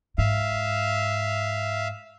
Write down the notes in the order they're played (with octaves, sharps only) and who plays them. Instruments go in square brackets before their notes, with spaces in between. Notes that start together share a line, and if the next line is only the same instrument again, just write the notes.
[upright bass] G#2 [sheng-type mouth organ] E5 F5